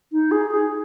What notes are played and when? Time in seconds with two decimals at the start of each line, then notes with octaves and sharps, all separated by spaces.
0.12 D#4
0.31 G#4
0.51 G#4